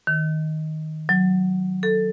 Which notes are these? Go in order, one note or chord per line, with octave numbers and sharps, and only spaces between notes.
D#3
F#3
A4